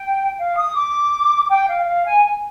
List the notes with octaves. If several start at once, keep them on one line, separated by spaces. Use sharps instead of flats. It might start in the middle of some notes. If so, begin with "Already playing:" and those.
Already playing: G5
F5
D#6
D6
G5
F5
F5
G#5